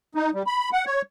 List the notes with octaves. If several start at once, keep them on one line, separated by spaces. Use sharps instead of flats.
D#4
G3
B5
F#5
C#5